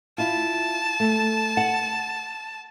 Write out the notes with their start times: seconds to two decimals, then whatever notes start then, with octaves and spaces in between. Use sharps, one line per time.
0.18 E4 F4 A5
1.00 A3
1.57 F#5